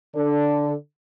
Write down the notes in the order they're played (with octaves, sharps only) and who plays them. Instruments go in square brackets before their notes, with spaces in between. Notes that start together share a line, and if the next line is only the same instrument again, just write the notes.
[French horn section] D3 D4 A4